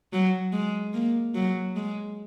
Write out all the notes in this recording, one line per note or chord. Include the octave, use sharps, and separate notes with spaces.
F#3
G#3
A#3
F#3
G#3